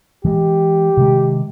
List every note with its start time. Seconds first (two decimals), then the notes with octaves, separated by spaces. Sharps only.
0.25 E3 G#3 G4
0.97 C3 D#3 G#3